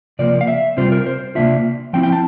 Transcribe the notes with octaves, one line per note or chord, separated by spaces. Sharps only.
C3 F3 A#3 D5
F5
E5
C3 G3 C4 F4 C5
A#4
C5
C3 F3 A#3 D4 F4 E5
F3 C4 E4 G5
G5
A5